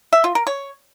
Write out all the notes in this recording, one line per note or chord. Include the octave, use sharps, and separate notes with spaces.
E5
F4
A#4
C#5